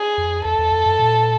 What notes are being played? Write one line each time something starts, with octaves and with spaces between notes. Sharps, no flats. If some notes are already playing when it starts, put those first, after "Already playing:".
Already playing: G#4
F2
E2 A4
E2
F2
F#2
A#2